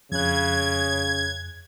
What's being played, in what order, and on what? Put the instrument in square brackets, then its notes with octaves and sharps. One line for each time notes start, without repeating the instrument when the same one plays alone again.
[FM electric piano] F2 F#6 [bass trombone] C#3 [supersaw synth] G#6